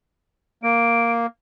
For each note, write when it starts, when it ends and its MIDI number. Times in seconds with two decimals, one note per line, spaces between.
0.63 1.26 58
0.63 1.11 98